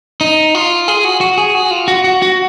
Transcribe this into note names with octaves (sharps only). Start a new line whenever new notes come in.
D#4
F4
G#4
F#4
F#4
G#4
F#4
F4
F#4
F#4
F#4